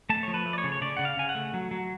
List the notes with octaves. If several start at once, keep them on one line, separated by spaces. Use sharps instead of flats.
A3 A5
F3 C#5
B4
A3
D5
C#5
C#3
C#5
C#3 D5
C#3 F#5
F5
C#3 G#5
F#5
A3
F#3
F#3